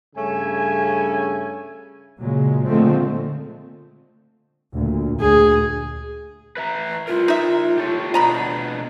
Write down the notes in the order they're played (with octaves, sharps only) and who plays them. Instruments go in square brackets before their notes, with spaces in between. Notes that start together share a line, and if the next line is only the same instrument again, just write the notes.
[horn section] G2 C#3 A3 C#4 G#5
[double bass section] A#2 C#3 F#3 G#3
A#2 D3 F3 G#3 A3 C4
D2 A#2
[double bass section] D2 [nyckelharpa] G#4
[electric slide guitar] B4 E5 A#5
[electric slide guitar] E4 A#4 [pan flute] F4
[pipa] D#4 E5
[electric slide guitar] G4 A4 C#5
[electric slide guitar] B2 B3 D4 [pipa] D#5 A#5 B5